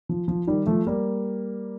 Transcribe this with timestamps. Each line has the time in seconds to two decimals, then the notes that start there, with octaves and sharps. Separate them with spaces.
0.09 F3
0.28 F3
0.47 D#3 G3
0.67 F3 A3
0.87 G3 A#3